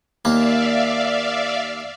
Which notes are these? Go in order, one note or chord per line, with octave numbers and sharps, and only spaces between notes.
D#2 A#3 D5 E5 F5